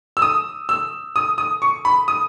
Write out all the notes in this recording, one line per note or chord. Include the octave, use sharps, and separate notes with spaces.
E6
D#6
E6
D#6
D#6
C#6
B5
D#6